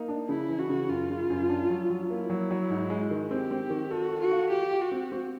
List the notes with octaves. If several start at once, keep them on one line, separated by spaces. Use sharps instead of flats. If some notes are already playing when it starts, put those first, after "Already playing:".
Already playing: A#3 D#4
D4
C#3 E4
E3
F#4
C#3
F#2 F4
C#3
F#2
D4
F#3
F#3
A#3 E4
F#3
F#3
G#2
G#3
D#3
C4 G4
C4
D#3
F#4 A4
A4
F#4
F4
F4 G4
F4
F#4
C4
C4